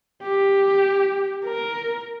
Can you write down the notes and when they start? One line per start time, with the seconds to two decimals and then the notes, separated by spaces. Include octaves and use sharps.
0.23 G4
1.46 A#4